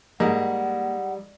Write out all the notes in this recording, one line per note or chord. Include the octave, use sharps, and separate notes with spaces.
G#2 G3 A#3 F#5